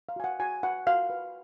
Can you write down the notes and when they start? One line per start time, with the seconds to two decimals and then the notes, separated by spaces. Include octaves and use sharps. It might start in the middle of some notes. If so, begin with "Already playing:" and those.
0.09 F5
0.16 F#4 G#5
0.24 F#5
0.40 F#4 G#5
0.63 F#4 F#5
0.87 F#4 F5
1.10 B4